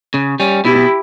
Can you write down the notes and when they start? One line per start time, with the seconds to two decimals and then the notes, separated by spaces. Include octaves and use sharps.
0.14 C#3
0.40 G3 C#4
0.65 B2 E4 G4